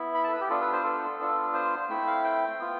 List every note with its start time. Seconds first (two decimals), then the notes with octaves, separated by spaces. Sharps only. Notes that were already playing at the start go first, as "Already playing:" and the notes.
Already playing: B3 E4
0.14 B5
0.24 A5
0.28 A4
0.33 B4
0.41 G4
0.50 B3 D4 F4 A4
0.61 B4
0.72 C5
0.84 A4
1.19 B3 D4 F4
1.54 C5
1.89 A3 C4 E4
2.07 F5
2.24 G5
2.59 B3 F4